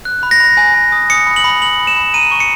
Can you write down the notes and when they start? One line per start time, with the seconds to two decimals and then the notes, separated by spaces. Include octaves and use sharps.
0.05 F#6
0.23 B5
0.31 A#6
0.40 B5
0.57 G#5
0.74 G#5
0.92 D#6
1.10 D#6 C#7
1.27 B5
1.36 F#7
1.44 B5
1.62 B5 F#7
1.80 B5
1.87 E7
1.97 B5
2.14 A#5 D#7
2.31 C#6
2.40 C#7